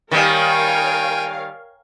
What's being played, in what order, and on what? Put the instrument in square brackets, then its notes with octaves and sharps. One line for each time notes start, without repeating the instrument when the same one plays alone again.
[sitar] D#3 G3 [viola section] A#4 C#5 F5 [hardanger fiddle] G5 G#5